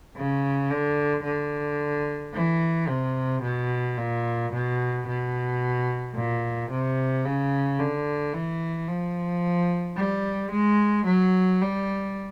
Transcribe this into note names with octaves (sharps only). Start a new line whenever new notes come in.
C#3
D3
D3
E3
C3
B2
A#2
B2
B2
A#2
C3
C#3
D3
E3
F3
G3
G#3
F#3
G3